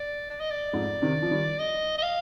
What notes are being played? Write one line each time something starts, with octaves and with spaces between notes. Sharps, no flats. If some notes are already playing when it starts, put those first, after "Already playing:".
Already playing: D5
D5
D#5
D5
F2 G#2
C3 D#3
F3
D#3 G3
D#5
D#5
F5